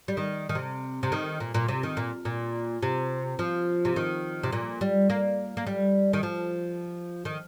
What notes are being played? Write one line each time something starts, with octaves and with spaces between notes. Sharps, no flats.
G3
D#3
D#3
C3
C3
D#3
A#2
A#2
C3
D#3
A#2
A#2
C3
F3
C3
D#3
C3
A#2
G3
A#3
A#3
G3
D#3
F3
D#3